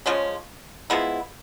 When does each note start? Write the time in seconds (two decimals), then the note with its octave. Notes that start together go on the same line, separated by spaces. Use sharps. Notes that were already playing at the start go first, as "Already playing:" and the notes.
0.06 C#3 F3 G#3 C#4
0.90 F3 G#3 B3 E4